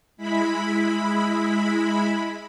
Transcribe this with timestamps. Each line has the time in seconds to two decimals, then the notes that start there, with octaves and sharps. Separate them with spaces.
0.17 G#3 E4 B5